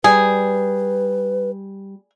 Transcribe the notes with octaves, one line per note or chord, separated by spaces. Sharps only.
G3 G#4 B4